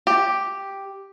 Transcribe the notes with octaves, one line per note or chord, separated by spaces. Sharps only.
G4